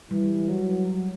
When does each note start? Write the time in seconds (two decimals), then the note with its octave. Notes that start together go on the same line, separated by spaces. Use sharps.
0.11 E3 G3
0.49 F#3